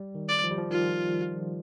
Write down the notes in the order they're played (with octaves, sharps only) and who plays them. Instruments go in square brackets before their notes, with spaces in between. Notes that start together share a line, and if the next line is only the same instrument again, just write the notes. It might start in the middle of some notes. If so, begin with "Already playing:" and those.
Already playing: [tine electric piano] G3
D#3
[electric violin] D5
[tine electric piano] F3
G3
F3
[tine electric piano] D#3 [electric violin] F4